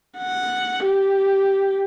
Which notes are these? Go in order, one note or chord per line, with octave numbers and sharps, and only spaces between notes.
F#5
G4